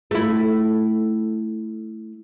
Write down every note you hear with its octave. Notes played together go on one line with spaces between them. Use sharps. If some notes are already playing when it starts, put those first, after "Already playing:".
A3 E4